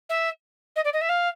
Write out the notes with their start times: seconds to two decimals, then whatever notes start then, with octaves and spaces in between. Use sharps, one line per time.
0.09 E5
0.76 D#5
0.85 D5
0.93 D#5
1.01 E5
1.09 F5